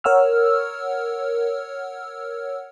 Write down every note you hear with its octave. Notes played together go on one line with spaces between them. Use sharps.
A#4 C#5 F#5 E6 F6